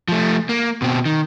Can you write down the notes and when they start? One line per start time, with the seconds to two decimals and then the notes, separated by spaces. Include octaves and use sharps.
0.08 F3 A3
0.49 A#3
0.82 B2 C4
1.05 D#3